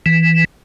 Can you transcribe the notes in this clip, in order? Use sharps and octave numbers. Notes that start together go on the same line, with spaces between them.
E3